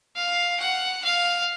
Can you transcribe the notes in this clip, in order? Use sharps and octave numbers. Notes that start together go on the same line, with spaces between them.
F5
F#5
F5